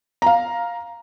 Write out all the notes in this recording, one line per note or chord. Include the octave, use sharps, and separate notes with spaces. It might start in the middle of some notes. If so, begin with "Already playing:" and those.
F5 A#5